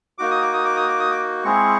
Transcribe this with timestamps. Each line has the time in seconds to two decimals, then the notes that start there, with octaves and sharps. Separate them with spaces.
0.18 A#3 D#4 F#4 D6
0.31 D#6
0.41 D6
0.53 D#6
0.65 D6
0.76 D#6
0.88 D6
0.99 D#6
1.11 D6
1.44 G#3 C4 E4 G#4 C#6